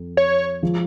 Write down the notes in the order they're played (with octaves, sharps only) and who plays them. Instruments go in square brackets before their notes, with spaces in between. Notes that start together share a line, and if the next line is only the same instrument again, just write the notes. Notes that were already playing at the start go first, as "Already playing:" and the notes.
Already playing: [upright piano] F2
[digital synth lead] C#5
[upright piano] F3 G#3